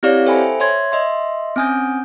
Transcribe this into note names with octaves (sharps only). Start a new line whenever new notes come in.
C4 E4 G4 C#5 D5 F5
A4 C5 E5 G5 G#5 B5
C#5 E5 C6 G#6
D#5 E5 C6
C4 C#4 G#5 D#6 G6